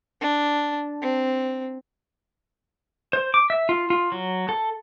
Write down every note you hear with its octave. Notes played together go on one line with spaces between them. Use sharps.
D4
C4
C5
D6
E5
F4
F4
F#3
A4